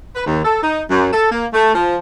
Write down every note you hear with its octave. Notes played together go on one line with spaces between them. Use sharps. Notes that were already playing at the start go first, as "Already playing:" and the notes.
B4
D#2
A4
D#4
F#2
A4
A#3
A3
F3